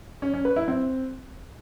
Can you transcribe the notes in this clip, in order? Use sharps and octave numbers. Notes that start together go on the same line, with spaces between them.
C#4
C#4
B4
E4
C4